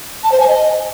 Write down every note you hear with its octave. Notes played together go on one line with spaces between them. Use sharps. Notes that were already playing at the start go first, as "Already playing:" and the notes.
A5
C5
G#5
D#5